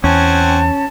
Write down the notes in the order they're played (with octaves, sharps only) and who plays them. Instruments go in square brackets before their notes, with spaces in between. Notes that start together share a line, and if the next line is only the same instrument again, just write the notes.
[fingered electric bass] E2 [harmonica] C4 F#5 G#5 [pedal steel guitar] C#4 [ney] A5